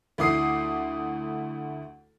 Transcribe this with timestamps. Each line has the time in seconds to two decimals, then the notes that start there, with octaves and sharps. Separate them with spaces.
0.18 D2 A3 E4 D6 D#6 C7